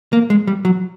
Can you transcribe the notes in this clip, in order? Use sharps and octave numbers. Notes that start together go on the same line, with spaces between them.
A#3
G#3
G3
F#3